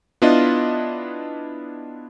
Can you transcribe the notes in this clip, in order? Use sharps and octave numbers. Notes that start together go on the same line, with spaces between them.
B3 D4 E4 F4 D#5